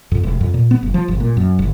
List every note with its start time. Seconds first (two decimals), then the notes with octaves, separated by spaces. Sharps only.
0.12 F2
0.23 E1
0.41 F2
0.54 A#2
0.71 B3
0.83 F#1
0.94 F3
1.08 G1
1.20 A#2
1.37 F#2
1.59 G1